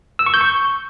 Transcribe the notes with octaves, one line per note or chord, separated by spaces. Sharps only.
E6
C#6
G6
C#6